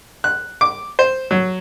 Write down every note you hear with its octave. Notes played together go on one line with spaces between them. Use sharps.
F#6
D6
C5
F#3